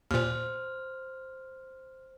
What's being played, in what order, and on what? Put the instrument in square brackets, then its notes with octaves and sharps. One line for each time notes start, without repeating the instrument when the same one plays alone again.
[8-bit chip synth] D#2 A#2 [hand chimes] C5 F6